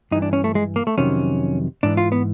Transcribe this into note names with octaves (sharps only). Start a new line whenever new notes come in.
G2 E3 D#4
D4
C#4
A3
G#3
A#3
A3
F2 C3 D#3 F#3 C#4
G#2 E3 D4
F4
B3